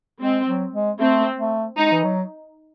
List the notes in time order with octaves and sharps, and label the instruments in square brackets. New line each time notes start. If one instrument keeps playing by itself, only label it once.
[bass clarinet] G#3 [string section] C4
[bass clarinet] F#3
G#3
[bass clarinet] A3 [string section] C4
[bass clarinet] A3
[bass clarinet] G#3 [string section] D#4
[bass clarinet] E3
F#3